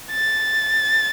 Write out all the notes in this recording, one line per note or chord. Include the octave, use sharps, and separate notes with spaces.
A6